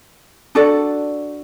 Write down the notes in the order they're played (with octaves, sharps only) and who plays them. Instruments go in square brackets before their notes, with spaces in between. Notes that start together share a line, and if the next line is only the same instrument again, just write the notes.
[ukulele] D4 F#4 A4 D5